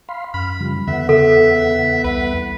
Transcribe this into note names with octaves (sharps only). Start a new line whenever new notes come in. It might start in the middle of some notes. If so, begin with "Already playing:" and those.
F5 B5 C6
F#2 B5 F6
C#3 F3 G3
E2 D3 B3 E5 F#5
C#3 A4 E5
C2 B4